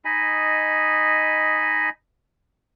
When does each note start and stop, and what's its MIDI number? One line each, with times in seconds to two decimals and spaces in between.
0.05 1.90 63
0.05 1.90 75
0.05 1.90 80
0.05 1.90 83